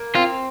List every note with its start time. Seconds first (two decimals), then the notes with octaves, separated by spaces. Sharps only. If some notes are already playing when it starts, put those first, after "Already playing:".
Already playing: A#3
0.15 C4 F4